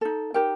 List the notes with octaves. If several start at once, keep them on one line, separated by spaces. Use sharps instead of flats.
D#4 A4
D#4 G4 A#4 G5